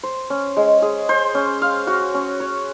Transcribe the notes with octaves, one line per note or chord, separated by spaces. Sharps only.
C5
C#4
G#3
G#4
C5
C#4
F5
F#4
C#4
C#5